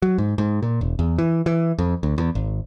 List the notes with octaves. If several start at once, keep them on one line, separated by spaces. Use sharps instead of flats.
F#3
G#2
G#2
A#2
E1
E2
E3
E3
F2
D2
E2
G#1